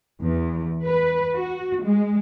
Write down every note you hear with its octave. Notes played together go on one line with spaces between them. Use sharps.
E2
B4
F#4
G#3